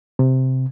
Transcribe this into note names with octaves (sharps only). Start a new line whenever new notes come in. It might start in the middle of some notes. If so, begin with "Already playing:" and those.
C3